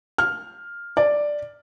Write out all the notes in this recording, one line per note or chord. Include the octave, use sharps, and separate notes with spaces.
F6
D5